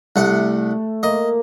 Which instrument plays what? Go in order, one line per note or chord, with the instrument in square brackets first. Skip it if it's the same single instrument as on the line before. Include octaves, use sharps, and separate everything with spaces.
[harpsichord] C2 F#5 [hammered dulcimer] A3
[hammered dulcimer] A#3 [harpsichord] D#5